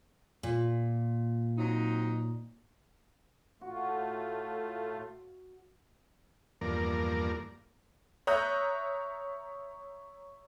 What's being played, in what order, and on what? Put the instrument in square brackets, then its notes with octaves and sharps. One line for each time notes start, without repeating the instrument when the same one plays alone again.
[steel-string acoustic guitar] A#2
[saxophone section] F#3 C4 D#4
[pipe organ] A2 A3 F4 [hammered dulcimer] F#4
[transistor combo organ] E2 G2 F3 A#3 A#4 D5
[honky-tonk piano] C#5 E5 A#5 D#6 F#6 G6